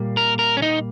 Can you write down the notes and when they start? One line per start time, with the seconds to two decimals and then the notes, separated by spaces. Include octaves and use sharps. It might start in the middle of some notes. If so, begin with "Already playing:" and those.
Already playing: A#2 G3 A#3
0.17 A#4
0.39 A#4
0.57 C#4
0.62 D#4